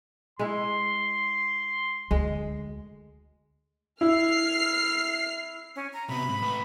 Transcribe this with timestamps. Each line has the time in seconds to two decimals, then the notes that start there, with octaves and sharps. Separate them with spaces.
0.39 G#3 E4 C6
2.11 D2 G#3
4.01 E4 F6 C7
5.76 C#4
5.93 A#5
6.09 C3 B3 B5
6.29 G#2
6.42 A3 B4